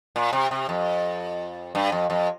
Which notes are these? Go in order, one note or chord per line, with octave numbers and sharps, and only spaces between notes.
A#2
C3
C3
F2
G2
F2
F2